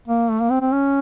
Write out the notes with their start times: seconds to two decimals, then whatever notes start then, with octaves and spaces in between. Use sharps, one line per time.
0.08 A#3
0.30 A3
0.40 A#3
0.50 C4
0.61 C4
0.72 C#4